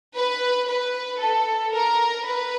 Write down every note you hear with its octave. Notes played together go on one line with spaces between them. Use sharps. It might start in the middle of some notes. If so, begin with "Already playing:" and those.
B4
B4
A4
A#4
B4